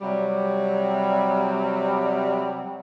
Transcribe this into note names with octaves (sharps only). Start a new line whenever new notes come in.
C3 F#3 G3